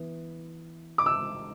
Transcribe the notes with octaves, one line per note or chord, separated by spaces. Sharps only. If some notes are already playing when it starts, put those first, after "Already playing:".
Already playing: E3 B3
D6
E6